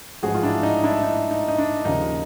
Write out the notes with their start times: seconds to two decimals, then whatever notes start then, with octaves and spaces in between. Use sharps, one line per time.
0.23 A1 G#2 F3 F#4 G#4
0.34 F4
0.43 D4 E4
0.63 D#4
0.84 D4 E4
1.03 D#4
1.31 D#4
1.48 D#4
1.58 D4
1.85 D#2 C#3 F3 D#4